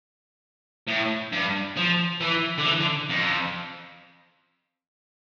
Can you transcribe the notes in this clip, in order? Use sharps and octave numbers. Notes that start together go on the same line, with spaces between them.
A2
G2
F3
E3
D3
E3
D3
F2